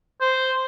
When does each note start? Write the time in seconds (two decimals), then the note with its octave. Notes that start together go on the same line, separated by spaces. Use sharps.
0.21 C5